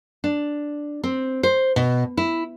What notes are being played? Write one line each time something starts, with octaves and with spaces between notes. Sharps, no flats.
D4
C4
C5
B2
E4